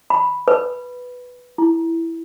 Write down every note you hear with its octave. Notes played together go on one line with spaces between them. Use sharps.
B5
B4
E4